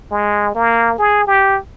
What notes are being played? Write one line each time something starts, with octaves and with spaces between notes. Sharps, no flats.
G#3
A#3
G#4
G4